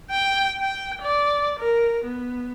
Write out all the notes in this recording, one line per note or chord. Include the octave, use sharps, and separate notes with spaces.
G5
G5
D5
A#4
B3